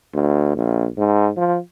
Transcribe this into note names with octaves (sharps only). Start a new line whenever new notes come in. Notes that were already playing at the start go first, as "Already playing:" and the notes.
D2
A#1
G#2
F3